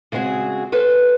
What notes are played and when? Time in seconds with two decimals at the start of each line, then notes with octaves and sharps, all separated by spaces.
0.12 C#3 G#3 C4 F#4 G#4
0.72 A4 B4 C5